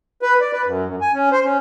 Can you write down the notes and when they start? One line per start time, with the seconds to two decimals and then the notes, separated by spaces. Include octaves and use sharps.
0.22 B4
0.41 D5
0.53 B4
0.66 F#2
0.86 F#2
1.01 G#5
1.14 C#4
1.32 C5
1.45 C#4